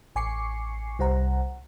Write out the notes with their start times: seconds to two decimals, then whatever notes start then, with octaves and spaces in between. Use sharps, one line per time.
0.16 A1 G#5 C#6 D6 C7 C#7
0.99 C2 G3 C5 F#5 A#5